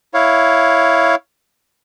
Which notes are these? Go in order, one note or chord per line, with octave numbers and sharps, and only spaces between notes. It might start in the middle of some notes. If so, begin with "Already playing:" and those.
E4 C#5 F5